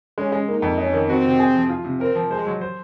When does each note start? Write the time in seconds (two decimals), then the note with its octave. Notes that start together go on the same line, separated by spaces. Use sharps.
0.18 G#3 C#4
0.32 G#3
0.48 A#3 D#4
0.62 F2
0.78 C#4 D#4
0.94 D#3
1.08 C4 F#4
1.25 C3
1.39 G#4
1.55 F3
1.69 F4
1.85 C3
2.00 C4 A#4
2.15 F3
2.31 G#3 C5
2.46 F#3
2.61 C5